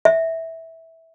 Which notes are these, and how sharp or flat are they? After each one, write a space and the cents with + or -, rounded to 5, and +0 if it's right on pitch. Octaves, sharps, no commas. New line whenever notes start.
E5 -15